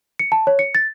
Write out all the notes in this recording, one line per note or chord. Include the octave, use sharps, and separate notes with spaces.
C#7
A5
C#5
C#7
A6